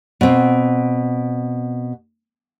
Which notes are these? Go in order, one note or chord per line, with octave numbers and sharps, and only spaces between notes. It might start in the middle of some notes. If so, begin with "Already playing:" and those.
B2 C4